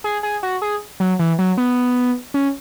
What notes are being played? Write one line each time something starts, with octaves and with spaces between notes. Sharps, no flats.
G#4
G#4
F#4
G#4
F#3
E3
F#3
B3
C#4